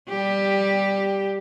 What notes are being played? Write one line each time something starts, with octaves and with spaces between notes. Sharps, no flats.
G3 G4